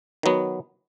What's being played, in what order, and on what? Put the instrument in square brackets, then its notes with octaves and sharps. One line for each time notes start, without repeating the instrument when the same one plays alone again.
[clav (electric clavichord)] D#3 F#3 B3